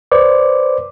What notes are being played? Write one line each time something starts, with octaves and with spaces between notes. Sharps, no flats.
B4 C5 D5 D6